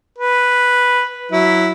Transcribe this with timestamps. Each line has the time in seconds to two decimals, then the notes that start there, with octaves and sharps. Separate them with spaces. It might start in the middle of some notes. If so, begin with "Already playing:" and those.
0.19 B4
1.32 F#3 E4